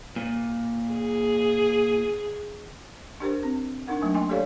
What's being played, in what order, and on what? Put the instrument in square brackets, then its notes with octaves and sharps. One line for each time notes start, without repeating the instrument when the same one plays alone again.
[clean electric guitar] A#2
[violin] G#4
[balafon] D4 G4 A#4 C5
C4
D4 D#4 A#4 F#5
F#3 A3 A#3 D4 D#4
D#5 G5 G#5 C6
G4 A4 C#5 D5 F5